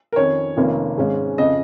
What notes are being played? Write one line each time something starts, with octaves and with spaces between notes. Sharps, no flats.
A#4
F2 D#3 C#4 C#5
F1 F2 D#3 A#3 C#4
G#1 G#2 G#3 C#4
F2 C#3 D#5